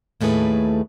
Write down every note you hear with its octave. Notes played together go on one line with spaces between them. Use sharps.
D#2 A2 A3 G#4 B4